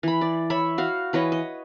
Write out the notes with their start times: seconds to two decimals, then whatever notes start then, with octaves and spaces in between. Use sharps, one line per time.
0.03 E3 B5
0.21 D5
0.50 C#5 E5 B5
0.78 F#4 F5
1.13 E3 B4 C#5 D#5
1.32 D#5